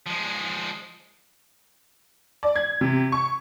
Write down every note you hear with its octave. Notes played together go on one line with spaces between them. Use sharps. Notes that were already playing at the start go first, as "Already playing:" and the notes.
F3 G#3
D5
G#6
C3
C#6